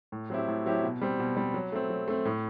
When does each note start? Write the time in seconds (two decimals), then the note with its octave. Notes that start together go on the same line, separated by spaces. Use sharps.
0.12 A2
0.30 F#3 C4 E4 G4
0.48 A2
0.66 F#3 C4 E4 G4
0.84 B2
1.02 G3 C4
1.20 B2
1.37 G3 C4
1.54 F#3
1.72 A3 C4
1.90 F#3
2.08 A3 C4
2.25 A2